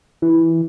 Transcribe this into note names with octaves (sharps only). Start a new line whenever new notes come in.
E3